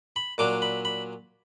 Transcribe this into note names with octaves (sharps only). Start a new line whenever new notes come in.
B5
A#2 F#3 D4 D6
B5
B5